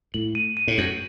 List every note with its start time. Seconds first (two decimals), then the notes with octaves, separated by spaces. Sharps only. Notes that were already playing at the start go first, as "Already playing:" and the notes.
0.14 A2 F#7
0.35 D#7
0.57 D#7
0.68 A2
0.78 F#2 F#7